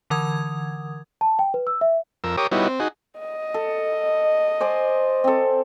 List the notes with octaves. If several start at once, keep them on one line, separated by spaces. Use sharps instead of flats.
D3 E3 A#4 F#5 D#6 G#6
A5
G5
B4
E6
E5
F2 A#4 E6
G4 A#4 C#5 D6 D#6
G3 B3 D#4 E4 F#4 C#5
C4
D#4 F#4 G#4
D#5
A4
C5 D5 G#5
C4 A4